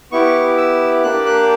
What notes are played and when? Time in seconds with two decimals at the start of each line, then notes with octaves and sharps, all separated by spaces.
0.12 B3 E4 G4 C#6
0.57 E6
1.03 A#3 D4 G4 F#6
1.26 F#6